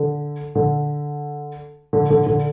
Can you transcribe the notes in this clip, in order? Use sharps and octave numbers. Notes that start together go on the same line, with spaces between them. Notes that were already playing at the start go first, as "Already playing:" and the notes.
Already playing: D3
D3
D3
D3
D3